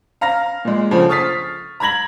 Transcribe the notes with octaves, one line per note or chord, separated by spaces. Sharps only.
F5 A#5 F6 A#6
A#2 G#3
D2 C#3 F3
C#6 D#6 F6 A6 B6 C7
A#5 B5 G#6 A#6 F#7